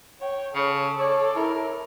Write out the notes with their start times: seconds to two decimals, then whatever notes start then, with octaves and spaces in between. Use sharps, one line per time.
0.21 C#5 G5
0.55 C#3 A4
0.99 C#5 D5
1.36 E4 A#4